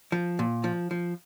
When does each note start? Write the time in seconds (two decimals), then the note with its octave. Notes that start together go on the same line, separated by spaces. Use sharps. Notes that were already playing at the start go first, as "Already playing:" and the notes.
0.12 F3
0.39 A#2
0.64 F3
0.91 F3